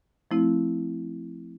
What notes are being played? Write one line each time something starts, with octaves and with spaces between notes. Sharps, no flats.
F3 A3 C4 E4